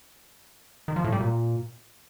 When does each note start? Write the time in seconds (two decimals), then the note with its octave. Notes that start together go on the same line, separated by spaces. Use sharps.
0.88 D#3
0.96 F3
1.04 A2
1.12 G3
1.20 A#2